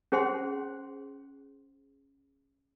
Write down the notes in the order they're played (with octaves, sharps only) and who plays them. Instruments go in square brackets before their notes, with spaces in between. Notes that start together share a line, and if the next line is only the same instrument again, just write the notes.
[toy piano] C#4 G#4 C5 F#5 C6